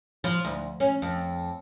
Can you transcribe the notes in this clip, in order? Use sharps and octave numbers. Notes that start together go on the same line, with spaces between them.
F3
D2
C#4
F2